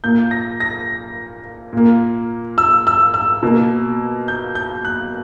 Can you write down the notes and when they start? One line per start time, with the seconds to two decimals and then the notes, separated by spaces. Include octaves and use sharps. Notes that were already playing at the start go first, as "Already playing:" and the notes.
0.04 A#2 A#3 G6
0.31 A#6
0.60 A#6
1.73 A#2 A#3
2.58 E6
2.87 E6
3.14 E6
3.43 B2 A#3
4.28 G6
4.55 G6
4.85 F#6